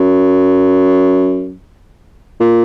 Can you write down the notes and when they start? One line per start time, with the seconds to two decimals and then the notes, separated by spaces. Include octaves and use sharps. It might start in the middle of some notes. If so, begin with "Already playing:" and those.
Already playing: F#2
2.40 A#2